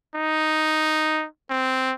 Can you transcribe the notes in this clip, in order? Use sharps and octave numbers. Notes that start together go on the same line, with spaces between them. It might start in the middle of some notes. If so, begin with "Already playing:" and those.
D#4
C4